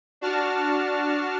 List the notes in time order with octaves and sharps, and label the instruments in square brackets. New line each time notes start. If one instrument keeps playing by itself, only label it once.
[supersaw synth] D4 F#4 A5 F6